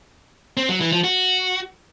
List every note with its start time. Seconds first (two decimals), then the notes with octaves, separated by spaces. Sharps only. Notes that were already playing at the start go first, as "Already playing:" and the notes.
0.57 C4
0.69 F#3
0.81 E3
0.93 F3
1.04 F#4